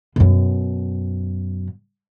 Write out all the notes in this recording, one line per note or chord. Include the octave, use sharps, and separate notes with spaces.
F#2 B2